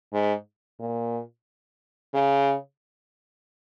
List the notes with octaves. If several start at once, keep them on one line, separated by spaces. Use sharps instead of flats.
G#2
A#2
C#3